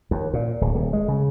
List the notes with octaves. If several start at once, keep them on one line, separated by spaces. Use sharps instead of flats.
D#2
A#2
D1
D#1
G#3
C#3